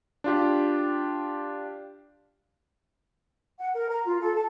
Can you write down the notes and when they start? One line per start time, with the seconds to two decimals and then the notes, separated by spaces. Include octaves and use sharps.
0.24 D4 F4 G4
3.58 F#5
3.73 A#4
3.88 A#5
4.04 F4
4.20 A4
4.34 A5